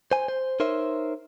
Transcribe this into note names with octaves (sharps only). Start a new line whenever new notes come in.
C5 G#5
C5
D#4 A#4 C5 C#5 E5